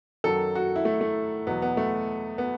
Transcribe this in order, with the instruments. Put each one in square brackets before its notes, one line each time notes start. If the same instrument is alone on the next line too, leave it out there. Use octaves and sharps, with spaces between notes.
[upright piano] F#2 D#3 F#3 A4
F#4
E4
A3
A3
E2 B2 F#3 B3
B3
A3
B3